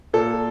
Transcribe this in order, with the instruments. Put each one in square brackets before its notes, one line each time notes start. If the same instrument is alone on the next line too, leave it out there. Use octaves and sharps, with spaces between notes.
[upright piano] A#2 A4